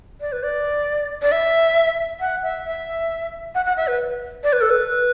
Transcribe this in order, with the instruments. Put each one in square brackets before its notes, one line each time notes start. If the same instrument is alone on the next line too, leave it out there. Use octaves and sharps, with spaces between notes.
[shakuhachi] D5
B4
D5
D5
E5
F#5
E5
E5
F#5
F#5
E5
B4
D5
B4
A4
B4